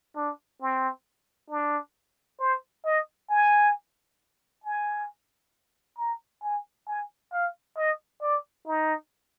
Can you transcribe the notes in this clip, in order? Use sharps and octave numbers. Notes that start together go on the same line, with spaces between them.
D4
C4
D4
C5
D#5
G#5
G#5
A#5
G#5
G#5
F5
D#5
D5
D#4